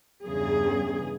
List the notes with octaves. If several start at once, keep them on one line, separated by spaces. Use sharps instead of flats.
E2 G2 C#3 G#4